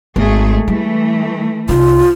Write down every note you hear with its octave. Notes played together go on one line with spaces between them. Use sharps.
G#1 G#3 A3 G#4
E3 G3 A3
C2 D#4 F4